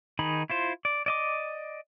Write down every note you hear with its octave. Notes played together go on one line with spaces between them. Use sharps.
D#3 D#4 G#4 B5
E4 F4 C5
D5
D5 D#5 D6